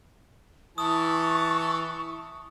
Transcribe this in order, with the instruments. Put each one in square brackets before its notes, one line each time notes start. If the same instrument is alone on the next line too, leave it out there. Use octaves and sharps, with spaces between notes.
[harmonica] E3 A5 [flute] C#6 [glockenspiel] D#6